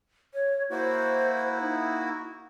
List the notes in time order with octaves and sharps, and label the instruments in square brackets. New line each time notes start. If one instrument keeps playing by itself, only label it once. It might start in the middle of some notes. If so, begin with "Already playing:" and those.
[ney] C#5
[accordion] A#3 E4 F#4 [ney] C5
[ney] D#4